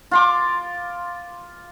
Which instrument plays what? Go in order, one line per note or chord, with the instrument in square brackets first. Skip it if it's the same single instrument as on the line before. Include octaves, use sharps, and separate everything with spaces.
[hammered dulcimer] F4 C6 D6